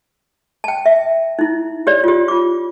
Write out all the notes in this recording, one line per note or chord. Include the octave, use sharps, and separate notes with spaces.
G5 A5
E5
D#4 E4
G4 C#5 D5
F4 G4
F4 D6